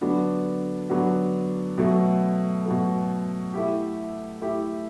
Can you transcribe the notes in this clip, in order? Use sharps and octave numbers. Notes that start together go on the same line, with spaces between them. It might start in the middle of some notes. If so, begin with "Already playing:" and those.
D3 F#3 B3 D4 F#4
D3 F#3 B3 D4 F#4
B2 F#3 A3
B2 F#3 A3
A3 E4 G4
A3 E4 G4